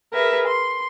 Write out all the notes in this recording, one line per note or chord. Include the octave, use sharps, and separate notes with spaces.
G#4 A#4 B4 E5
C6